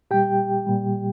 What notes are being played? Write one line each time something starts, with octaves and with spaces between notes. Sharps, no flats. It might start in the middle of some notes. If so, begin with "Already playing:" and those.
A#2 G3 G4 G5
A#2 G3